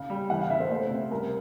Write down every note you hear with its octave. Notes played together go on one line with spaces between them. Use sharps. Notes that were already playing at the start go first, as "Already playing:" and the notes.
Already playing: C#3 F5
G3
E3 F#5
F5
C#3 E5
C5
A3 C5
C3
G3 A#4